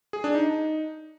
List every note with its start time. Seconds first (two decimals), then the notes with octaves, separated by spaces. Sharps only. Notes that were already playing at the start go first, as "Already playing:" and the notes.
0.13 G#4
0.24 D4
0.35 D#4